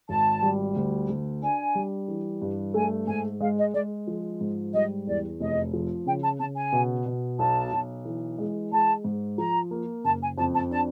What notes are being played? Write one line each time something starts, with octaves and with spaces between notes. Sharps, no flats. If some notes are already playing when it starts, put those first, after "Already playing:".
G#1 A5
G3
D2
D2
D4 G#5
G3
E3
G2
A3 G#5
G#2 G#5
G#3 F5
D#5
G#3 D5
F3
G#2
G3 D#5
E2 D5
F1 D#5
F3
C#3 G5
A5
C#3 A5
G#5
B2
B2
B1 A5
B1
E3
G#3
G#3 A5
G#2
F3 A#5
A#3
F#1 A5
G#5
F2 A5
A5
D4 A5